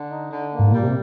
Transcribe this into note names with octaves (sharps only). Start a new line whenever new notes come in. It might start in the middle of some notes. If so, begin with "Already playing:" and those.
Already playing: D3
D#4
D3
A#3
G#2
A#2 G3
C3